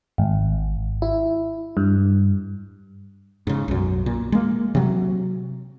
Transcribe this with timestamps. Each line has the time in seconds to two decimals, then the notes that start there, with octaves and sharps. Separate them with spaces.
0.18 G#1
1.02 E4
1.77 G2
3.47 G#2 C#3
3.68 B1 F#2
4.06 A#2
4.32 G#3 A#3
4.75 C3 F#3